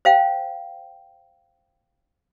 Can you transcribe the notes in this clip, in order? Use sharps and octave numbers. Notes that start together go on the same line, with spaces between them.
C5 F5 G5